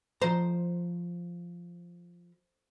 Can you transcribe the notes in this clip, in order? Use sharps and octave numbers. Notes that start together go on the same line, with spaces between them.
F3 C5 A#5